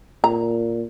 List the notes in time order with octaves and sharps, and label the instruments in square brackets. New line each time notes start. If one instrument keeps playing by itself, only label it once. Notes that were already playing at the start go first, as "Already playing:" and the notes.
[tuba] A#2 [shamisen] A#5